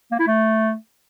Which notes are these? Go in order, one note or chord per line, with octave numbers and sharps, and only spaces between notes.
A#3
E4
A3